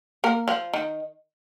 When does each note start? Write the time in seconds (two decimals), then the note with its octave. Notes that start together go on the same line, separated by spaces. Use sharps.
0.24 A#3 A#4
0.48 F3 F4
0.74 D#3 D#4